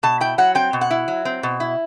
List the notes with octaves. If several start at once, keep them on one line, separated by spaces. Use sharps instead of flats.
B2 A5
E4 G5
F#3 F#5
C4 G5
B2
F#5
E4
F#3
C4
B2
E4